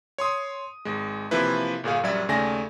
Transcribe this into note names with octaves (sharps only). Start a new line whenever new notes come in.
C#5 C6 D#6
G#1 G#3
C3 E3 F3 A#3 E4 B4
G1 A#2 G#4 F5
A#1 F#2 G3 D5 E5 G#6
D#2 C#3 A3 D5 G#5 A#6